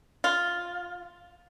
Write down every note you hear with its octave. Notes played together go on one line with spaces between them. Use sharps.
F4